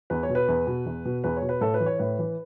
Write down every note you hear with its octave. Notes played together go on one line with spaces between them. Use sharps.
E2 B4
C#5
B2
B4
E2
B2
E2
B2
E2 B4
C#5
B2
B4
A2 A4
B4
E3
C#5
A2 B4
E3